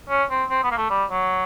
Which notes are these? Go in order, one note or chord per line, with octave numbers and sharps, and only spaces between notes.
C#4
C4
C4
B3
A#3
A3
G3
F#3